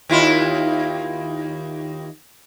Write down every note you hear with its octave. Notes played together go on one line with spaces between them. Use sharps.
D#2 E4 F4